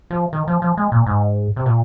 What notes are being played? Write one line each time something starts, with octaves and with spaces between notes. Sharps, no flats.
F3
D#3
F3
F3
G#3
A#2
G#2
C3
A#2